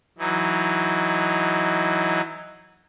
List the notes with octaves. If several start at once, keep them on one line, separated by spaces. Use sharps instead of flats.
E3 F#3 D#4